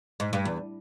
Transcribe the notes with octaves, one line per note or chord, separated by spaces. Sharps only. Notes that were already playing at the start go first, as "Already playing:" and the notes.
G#2
G2
E2